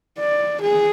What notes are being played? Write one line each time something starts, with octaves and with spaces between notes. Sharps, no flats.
D5
G#4